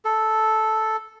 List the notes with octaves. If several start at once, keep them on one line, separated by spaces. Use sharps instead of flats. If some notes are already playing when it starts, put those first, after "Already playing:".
A4